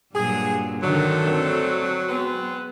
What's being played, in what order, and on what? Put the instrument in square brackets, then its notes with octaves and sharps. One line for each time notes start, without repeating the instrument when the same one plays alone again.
[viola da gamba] G2 A#2 F#3 [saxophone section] G#4
[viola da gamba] D3 D#3 [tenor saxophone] F#3 [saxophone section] A3 D4 A4
[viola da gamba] C4
[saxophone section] G#3 C4 B4 [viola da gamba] B3